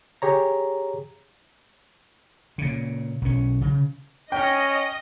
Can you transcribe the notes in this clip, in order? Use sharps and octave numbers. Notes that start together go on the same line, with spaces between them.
G4 G#4 C#5 A#5
A#2 C#3
B1 C#4
C#3
C#4 D#5 G5